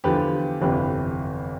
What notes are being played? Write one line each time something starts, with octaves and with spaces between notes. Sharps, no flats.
E2 D3 F3 G4 B4
G1 F2 C3 E3 G4 B4